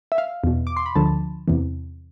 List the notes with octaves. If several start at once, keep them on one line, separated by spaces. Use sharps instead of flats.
E5
F5
E2 B2
D6
C6
B5
D2 D3 F3 A5
E2 C3 E3